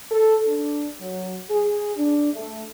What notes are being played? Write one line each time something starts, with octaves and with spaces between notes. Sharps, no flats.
A4
D4
F#3
G#4
D4
A3